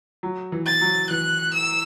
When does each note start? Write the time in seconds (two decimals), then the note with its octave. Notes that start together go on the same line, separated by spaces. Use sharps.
0.23 F#3
0.52 E3
0.67 A6
0.81 F#3
1.10 E3 F#6
1.54 E6